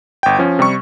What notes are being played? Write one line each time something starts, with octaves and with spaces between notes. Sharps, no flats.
G1 G5
F3 C#4
C3 G3 C#6